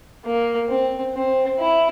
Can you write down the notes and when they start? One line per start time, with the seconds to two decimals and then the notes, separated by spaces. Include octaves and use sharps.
0.25 A#3
0.69 C4
1.14 C4
1.59 E4